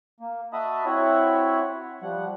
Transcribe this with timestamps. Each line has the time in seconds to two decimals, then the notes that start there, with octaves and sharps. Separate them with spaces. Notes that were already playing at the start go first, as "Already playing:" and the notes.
0.20 A#3
0.53 F#4 D#5 E5 A5 B5 D#6
0.86 C4 E4 F#4 C#5 E5 F#5
2.02 F3 G3 F#5